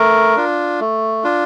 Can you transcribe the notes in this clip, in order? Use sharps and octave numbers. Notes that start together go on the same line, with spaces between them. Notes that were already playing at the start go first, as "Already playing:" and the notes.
Already playing: A3 A#4
D4 F4
A3
D4 F4